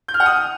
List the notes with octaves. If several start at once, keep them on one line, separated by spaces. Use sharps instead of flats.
G6
F6
F#5
D#6